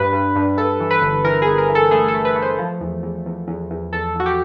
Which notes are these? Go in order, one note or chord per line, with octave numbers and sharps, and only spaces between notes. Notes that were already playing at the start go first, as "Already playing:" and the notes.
Already playing: G2 B4
G2
G2
G2 A4
E3
B4
G1
E3 A#4
G1 G#4
A#4
E3
A4
A3 G#4
A4
A3
B4
A3
C5
F3
E2
E2
E2
E2
E2
E2 A4
E2 F#4
G4